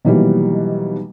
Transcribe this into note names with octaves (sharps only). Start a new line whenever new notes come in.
B2 D#3 E3 F#3 G3 A#3